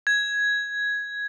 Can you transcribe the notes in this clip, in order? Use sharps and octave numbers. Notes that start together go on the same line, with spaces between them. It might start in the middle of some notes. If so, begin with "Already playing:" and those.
G#6